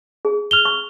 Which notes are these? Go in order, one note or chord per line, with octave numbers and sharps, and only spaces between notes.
G#4
F6 F7 G7
C#6